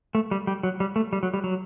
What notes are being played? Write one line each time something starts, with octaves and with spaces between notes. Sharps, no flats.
A3
G3
G3
F#3
G3
A3
G3
F#3
G3
F#3